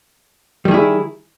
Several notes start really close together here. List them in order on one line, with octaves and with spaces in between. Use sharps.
G3 D#3 G#4 E4